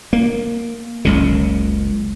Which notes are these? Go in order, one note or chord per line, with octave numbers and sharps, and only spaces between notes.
A#3
F#1 C#2 C#3